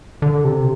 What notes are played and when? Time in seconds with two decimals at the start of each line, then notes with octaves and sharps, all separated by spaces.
0.22 D3
0.44 C3